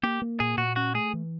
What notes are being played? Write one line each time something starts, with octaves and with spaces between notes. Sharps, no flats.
A#3 G4
A#3
A#2 G#4
A#2 F#4
C#4 F#4
A3 G#4
E3